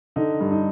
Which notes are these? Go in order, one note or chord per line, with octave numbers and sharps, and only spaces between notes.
D3 D#4
G2
D#4